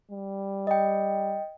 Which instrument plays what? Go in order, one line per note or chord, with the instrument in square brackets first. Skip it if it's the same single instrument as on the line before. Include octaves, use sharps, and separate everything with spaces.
[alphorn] G3
[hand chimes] D#5 G5